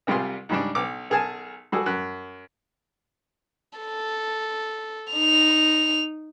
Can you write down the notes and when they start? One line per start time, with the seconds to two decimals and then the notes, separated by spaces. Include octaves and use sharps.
0.07 C2 C3 G3 F4 G#4 C6
0.49 G#2 C#3 G3 D4
0.75 B1 D6
1.10 B1 G#4 A#4 G#5 A5
1.72 G3 F#4 G#4 A4
1.86 F#2 F#6
3.79 A4
5.13 D#4 F7